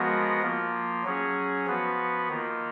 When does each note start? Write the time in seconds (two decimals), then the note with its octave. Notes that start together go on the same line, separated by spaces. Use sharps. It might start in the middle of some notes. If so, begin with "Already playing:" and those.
Already playing: F3 G#3 B3 F#4 A#4
0.42 F3 A#3 F4
1.04 F#3 C#4 G#4
1.66 F3 B3 F#4 B4
2.28 D#3 A#3 F4